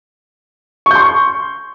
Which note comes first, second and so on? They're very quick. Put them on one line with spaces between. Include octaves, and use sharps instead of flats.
C#6 G6 C6